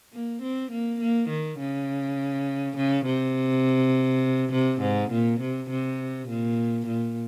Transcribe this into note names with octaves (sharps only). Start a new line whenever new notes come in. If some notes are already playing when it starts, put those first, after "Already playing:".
A#3
C4
A#3
A#3
D#3
C#3
C#3
C3
C3
G#2
A#2
C3
C3
A#2
A#2